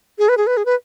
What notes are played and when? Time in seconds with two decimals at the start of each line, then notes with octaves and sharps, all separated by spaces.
0.19 G#4
0.29 B4
0.38 G#4
0.47 B4
0.57 G#4
0.66 B4